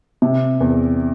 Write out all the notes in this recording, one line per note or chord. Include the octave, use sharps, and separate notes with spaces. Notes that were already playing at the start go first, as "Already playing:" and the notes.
C3
E2